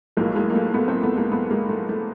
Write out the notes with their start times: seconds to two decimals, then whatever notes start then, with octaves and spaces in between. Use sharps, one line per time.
0.17 B1 A2 F3 G#3 A#3
0.36 G#3 A#3
0.50 A#3
0.55 A3
0.74 A3 B3
0.88 A#3 C4
1.03 A3 B3
1.17 G#3 A#3
1.32 A3 B3
1.51 G#3 A#3
1.69 A3
1.89 A3